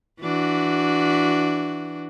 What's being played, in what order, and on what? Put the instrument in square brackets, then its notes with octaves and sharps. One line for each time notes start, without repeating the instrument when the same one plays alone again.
[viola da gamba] E3 D4 F#4